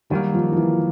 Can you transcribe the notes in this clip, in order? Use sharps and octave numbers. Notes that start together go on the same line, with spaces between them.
D#3 F#3 G3 A#3
F3
F3
E3